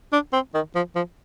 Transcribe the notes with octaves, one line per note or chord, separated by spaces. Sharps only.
D4
C4
D#3
F3
F3